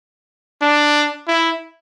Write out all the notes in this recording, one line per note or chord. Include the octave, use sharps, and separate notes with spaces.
D4
E4